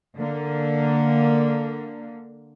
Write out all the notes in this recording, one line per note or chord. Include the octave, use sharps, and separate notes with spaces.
D3 A#3